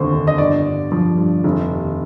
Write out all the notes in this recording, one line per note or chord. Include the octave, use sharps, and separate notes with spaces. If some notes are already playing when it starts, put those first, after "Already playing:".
Already playing: F1 D#2 D3 C5
D3
D#5
G1 D5
G1
F3
G2
F1
D#2